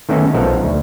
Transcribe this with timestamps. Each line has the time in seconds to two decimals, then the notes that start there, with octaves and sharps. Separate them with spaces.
0.09 D#3 A3 B3 C#4 D#4 A4
0.34 B1 F3 D#4 A4 A#4 F#5
0.64 D2